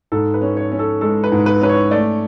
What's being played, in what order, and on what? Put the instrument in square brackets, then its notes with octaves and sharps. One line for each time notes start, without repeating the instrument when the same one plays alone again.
[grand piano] G#2 A4
B4
C#4
C#5
C#4
A4
G#3 A4
B4
G#2
B4
C#4 B4
C#5
A3 D5